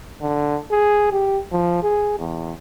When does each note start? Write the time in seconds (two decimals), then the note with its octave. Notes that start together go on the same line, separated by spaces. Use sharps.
0.21 D3
0.71 G#4
1.12 G4
1.52 F3
1.83 G#4
2.19 E2